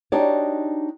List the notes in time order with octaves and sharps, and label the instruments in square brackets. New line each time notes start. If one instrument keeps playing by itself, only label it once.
[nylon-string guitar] D4 D#4 F#4 G4 C#5 D5